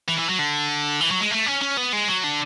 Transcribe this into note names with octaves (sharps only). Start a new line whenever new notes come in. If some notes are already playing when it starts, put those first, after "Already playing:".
E3
E3
F#3
D3
E3
F#3
G#3
A3
C#4
C#4
B3
G#3
F#3
D3